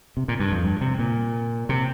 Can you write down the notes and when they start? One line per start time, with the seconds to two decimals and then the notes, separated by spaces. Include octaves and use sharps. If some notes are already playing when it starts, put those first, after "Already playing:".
0.17 C3
0.28 A#2
0.40 G2
0.52 F2
0.64 G2
0.81 C3
0.99 A#2
1.69 C3